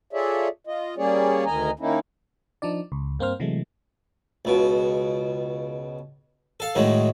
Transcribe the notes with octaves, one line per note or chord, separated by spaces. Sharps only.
F4 G#4 A4 C#5 D5 E5
F4 D#5
G3 A#3 C#4 G#4 C#5 D5
D2 D#3 D#5 G#5 A#5
D#3 A#3 C#4 D#4 E4
F3 D4 D#4 D5
C#2
G2 A#3 C4 C5 F6
C3 E3 F#3 G#3 A3
C#2 B2
A4 F5
A2 D#3 F#3 G#3